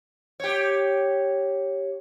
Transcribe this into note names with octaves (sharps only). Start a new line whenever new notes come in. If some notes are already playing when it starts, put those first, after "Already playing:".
G4 C#5